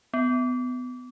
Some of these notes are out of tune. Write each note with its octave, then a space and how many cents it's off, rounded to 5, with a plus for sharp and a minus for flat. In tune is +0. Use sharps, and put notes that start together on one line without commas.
B3 +25